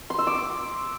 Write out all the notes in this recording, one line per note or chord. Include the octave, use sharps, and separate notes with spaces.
C6
E6
D6